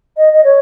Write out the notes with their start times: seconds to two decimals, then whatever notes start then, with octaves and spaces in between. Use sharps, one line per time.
0.17 D#5
0.33 D#5
0.44 C#5